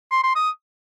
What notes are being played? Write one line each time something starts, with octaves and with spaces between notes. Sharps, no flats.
C6
C6
D#6